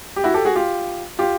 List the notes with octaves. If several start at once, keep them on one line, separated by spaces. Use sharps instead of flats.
G4
E4 F#4
G4 A4
F#4 G#4
F4 G4
F4 G4